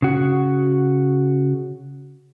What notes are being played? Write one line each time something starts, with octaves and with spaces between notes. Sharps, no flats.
C#3 F#4